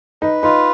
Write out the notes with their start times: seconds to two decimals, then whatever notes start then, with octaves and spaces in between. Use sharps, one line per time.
0.22 D#4 B4
0.43 D#4 F4